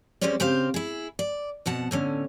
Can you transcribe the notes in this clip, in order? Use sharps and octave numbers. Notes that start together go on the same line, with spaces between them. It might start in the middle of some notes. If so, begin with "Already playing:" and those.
F3 G3 G#3 C4 C#4 D5
C#3 C4 G4 C5 F5
E4 G#4
D5
F2 B2 F#5 A5
A2 D3 C#4